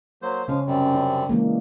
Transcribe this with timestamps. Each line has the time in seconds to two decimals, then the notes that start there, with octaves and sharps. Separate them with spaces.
0.22 F#3 A#3 C5
0.48 C#3 F3 G#3 C#4 F5
0.66 F#2 C3 G3
0.95 D4
1.29 E3 G#3 A#3